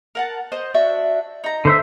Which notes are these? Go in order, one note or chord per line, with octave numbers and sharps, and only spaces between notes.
A#4 F#5 A5
C5 D#5
D4 F#4 E5
D#4 A#5
D3 C5 E5